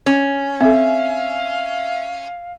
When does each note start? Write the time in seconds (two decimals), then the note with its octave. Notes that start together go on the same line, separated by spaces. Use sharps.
0.06 C#4
0.61 C4 A4 E5 F5